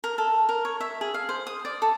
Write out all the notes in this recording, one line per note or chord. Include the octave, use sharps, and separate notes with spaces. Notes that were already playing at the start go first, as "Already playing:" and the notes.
A#4
A4
A#4
C#5
E5
G#4
F5
C5
D#6
D5
A4